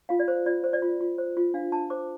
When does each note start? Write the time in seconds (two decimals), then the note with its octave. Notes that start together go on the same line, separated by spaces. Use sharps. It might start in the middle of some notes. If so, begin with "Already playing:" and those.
0.09 F4 F5
0.19 D5
0.28 C5
0.46 F4 D5
0.64 C5
0.73 D5
0.82 F4
1.01 F4
1.18 C5
1.37 F4
1.54 D4 F5
1.72 D4 A5
1.90 C5 D6